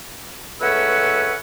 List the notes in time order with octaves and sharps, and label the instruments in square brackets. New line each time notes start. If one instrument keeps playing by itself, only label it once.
[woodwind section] C#2 A3 C#4 B4 F#5 E6